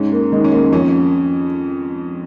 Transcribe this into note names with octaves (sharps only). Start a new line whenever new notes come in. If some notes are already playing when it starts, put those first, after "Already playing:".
Already playing: G#2 C#4
A#3
D#3 G#3
C#4
A#3
F2 C#4